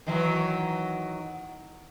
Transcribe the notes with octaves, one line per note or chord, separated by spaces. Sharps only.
D#3 E3 F#3